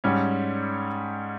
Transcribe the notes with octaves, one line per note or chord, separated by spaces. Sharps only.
G#2 G3 C#4